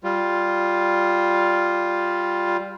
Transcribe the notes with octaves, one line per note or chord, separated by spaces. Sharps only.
G3 F4